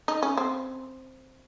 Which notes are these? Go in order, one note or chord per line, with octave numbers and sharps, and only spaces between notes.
D#4
C#4
C4